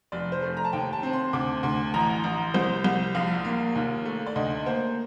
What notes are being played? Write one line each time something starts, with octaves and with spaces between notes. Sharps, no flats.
F1 D5
C5
A3
A#5
A5
D#2 G5
A5
C4
C6
D2 D6
D2 C6
A1 A#5
A1
C2 C5
C2
A#1 F5
A#3
D#2
A3
D5
D2 D#5
A#3 C5